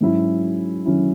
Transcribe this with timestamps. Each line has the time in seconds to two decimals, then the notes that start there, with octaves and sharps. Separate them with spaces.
0.01 G#2 F#3 C#4 E4
0.86 F#3 C#4 E4